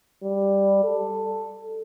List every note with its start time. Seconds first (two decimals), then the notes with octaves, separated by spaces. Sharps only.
0.23 G3
0.84 A4